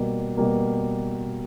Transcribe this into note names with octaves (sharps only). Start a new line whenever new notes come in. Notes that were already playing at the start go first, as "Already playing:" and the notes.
Already playing: B2 G3 A#3
B2 G3 A#3